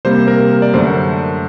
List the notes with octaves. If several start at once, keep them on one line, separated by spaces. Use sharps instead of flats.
C3 G3 A#3 C5
A#4
A#4
D5
F#2 D3 A3 C5